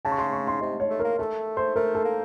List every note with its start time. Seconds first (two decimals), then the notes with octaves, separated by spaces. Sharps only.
0.05 C#3 A5
0.12 C#6
0.18 C6
0.33 C#6
0.47 C6
0.61 C3 D#5
0.80 C#5
0.90 A3
0.99 A#4
1.04 A#3
1.19 A3 A4
1.57 C5
1.76 A3 A#4
1.95 A4
2.05 A#3